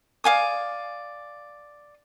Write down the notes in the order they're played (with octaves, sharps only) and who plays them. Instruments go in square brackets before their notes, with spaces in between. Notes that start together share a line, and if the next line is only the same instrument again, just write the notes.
[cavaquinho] D5 F5 G#5 D#6